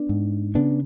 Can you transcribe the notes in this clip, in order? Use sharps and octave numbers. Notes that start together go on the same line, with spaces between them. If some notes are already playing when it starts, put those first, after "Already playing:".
Already playing: B3 D4
G#2
C#3 B3 D4